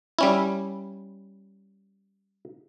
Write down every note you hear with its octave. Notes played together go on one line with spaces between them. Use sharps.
G3 C#4 E4